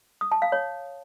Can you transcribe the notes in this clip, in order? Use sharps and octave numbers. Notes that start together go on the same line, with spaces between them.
D#6
A5
F5
C#5